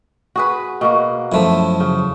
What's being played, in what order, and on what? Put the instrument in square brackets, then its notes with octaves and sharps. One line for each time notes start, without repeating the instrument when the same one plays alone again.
[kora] F#4 G#4 B4
B2 A#3 F#4
[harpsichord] F#2 F3 [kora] A3 E4
[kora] C#3